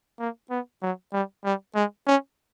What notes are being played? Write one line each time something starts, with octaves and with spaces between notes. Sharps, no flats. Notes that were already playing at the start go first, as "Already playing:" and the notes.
A#3
B3
F#3
G3
G3
G#3
C#4